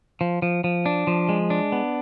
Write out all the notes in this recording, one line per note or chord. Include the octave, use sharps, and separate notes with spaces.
F3
F3
F3
D4
F3
G#3
D4
B3